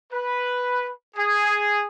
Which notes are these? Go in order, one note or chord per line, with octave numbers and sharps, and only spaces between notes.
B4
G#4